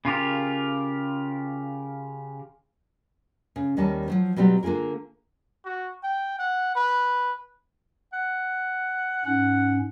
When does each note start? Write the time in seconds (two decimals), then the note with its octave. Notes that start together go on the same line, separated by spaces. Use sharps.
0.05 C#3 F4 G4 A#4
3.56 C#3
3.77 D#2 D#3 G3 C#4 A5
4.08 F3 F#3 C5
4.36 B2 F#3 G3 C4 G4
4.63 D3 A#3 F4 G#4 A#4
5.65 F#4
6.03 G5
6.39 F#5
6.75 B4
8.13 F#5
9.25 G#2 C#4 F#5